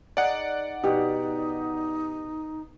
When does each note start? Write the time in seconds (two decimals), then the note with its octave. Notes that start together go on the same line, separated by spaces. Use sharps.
0.17 D#4 G#4 D5 F#5
0.84 B2 D#4 G4